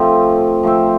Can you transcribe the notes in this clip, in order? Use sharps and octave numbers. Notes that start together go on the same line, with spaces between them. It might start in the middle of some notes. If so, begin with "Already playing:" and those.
Already playing: F3 A3 C4
F3 A3 C4